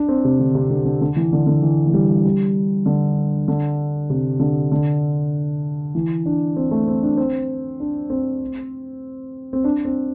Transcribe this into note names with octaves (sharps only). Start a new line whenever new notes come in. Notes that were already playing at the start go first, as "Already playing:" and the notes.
Already playing: D4
C4
C3
D3
C3
D3
D3
D3
E3
D3
D3
E3
E3
G3
G3
D3
D3
C3
D3
D3
E3
D4
C4
A3
C4
D4
C4
D4
C4
C4
D4
C4